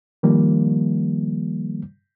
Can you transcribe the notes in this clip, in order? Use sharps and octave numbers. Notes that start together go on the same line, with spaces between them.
D#3 F3 G3 A#3